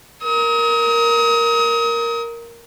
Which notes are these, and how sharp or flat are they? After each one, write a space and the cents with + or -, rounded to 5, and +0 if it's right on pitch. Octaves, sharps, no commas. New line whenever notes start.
A#4 +0 D#6 +35